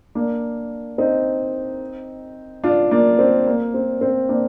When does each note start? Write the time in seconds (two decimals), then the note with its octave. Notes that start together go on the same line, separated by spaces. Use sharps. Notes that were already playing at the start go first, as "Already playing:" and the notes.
0.15 A#3 D4
0.98 C4 D#4
2.64 D4 F4
2.91 A#3 D4
3.19 C4
3.47 A#3
3.74 C4
4.01 C4
4.29 A#3 D4